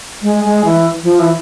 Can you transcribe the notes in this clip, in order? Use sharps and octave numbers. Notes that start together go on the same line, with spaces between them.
G#3
G#3
E3
F3
E3